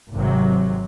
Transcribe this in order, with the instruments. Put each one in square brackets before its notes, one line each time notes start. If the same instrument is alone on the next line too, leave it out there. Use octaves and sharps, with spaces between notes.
[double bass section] G#1 C3 F#3